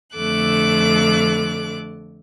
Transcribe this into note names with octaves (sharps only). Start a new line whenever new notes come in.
F2 D3 A3 A4 D6 F#6